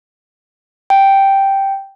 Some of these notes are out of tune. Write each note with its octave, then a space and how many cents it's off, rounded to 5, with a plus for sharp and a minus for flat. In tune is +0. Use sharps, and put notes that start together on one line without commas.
G5 +0